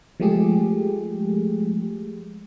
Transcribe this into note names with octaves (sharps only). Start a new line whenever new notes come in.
F3 G#3 A3 G4 G#4